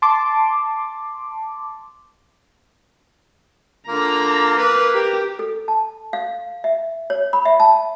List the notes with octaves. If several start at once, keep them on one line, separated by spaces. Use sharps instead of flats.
A5 C6 D6
D3 A#3 F4 A#5
A#3 A#4 B4
G4 A#4
A4
A5
F5
E5
C#5
B5
E5
A5